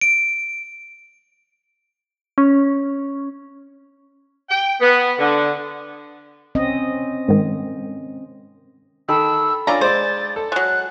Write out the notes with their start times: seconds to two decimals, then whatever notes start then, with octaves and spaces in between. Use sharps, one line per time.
0.01 D7
2.38 C#4
4.50 G5
4.80 B3
5.19 D3
6.55 C4 C#4 D#5
7.28 G#2 D#3
9.09 D#3 A4 G5 B5 E6
9.67 C#4 D4 F4 D5 G#5 A#5
9.81 G#3 C5 D5 A6
10.36 A4
10.52 F#3 G#3 F#6